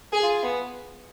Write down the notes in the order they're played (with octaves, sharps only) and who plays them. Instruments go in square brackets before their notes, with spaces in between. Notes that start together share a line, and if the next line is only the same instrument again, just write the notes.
[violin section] G#4
[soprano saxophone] F4
B3